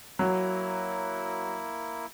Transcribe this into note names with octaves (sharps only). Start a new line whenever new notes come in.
F#3 A#3 E4